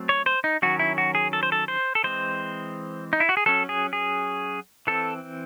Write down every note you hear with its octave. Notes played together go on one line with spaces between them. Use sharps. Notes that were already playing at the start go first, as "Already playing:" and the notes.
Already playing: F#3 A3 C4
C#5
C5
D#4
D#3 F#3 C#4 F#4
E4
F#4
G#4
A4
C5
A4
C5
A4
E3 G#3 C4 C5
D#4
E4
F#4
G#4
F#3 C#4 A4
G#4
G#4
E3 C4 A4